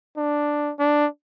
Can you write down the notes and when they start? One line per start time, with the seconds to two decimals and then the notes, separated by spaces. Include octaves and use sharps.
0.17 D4
0.79 D4